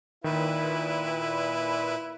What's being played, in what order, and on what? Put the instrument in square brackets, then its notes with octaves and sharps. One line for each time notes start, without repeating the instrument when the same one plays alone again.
[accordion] A#2 B4 [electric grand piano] D#3 [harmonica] E4